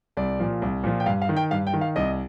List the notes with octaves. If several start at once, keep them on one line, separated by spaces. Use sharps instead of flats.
C2 D5
A#2 F3
C2
A#2 F3
G5
G2 F5
F5
D#3
G5
G2 F5
G5
D#3
F5
C2 D#5